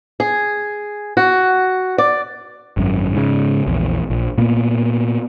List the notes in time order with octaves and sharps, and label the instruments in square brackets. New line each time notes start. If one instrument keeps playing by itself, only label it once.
[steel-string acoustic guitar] G#4
F#4
D5
[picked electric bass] G#1 F#2
G#2 C#3
A#1 E2
A#1
A#2 A#3 B3